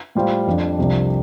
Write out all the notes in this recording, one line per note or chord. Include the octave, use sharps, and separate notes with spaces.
A2 G3 F4 C5
F2 F3 D4
C2 C3 F3 D4